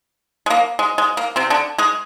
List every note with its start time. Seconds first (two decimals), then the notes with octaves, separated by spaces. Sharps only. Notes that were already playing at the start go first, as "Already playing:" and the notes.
0.46 G#3
0.50 A#3
0.79 G#3
0.98 G#3
1.17 A#3
1.36 C3 C4
1.50 D3 D4
1.78 G#3 G#4